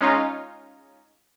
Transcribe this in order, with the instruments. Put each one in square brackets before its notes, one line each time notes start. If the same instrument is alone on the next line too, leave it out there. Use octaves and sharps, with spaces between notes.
[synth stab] G#3 C#4 D#4 F4